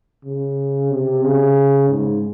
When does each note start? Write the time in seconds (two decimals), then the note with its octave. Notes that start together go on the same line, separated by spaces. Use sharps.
0.25 C#3
0.91 C3
1.22 C#3
1.89 G#2